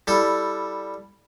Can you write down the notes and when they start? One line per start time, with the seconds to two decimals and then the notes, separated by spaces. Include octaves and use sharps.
0.07 G3 E4 A4